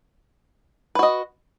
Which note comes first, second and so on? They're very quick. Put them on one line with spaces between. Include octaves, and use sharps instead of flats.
B4 F#4 D#5